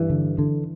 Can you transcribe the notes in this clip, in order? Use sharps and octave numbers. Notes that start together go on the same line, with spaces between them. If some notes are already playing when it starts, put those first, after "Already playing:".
Already playing: G2 E3
D3
D3